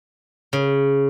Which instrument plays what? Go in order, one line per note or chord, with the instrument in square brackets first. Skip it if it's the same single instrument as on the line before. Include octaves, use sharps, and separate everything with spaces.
[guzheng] C#3